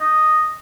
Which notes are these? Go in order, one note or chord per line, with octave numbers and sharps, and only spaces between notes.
D#5